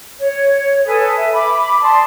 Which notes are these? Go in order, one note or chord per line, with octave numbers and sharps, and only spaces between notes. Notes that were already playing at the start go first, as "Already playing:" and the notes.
C#5
A4 B4 G#5 D#6
E5
B5 D6
D5 A5 C6 D#6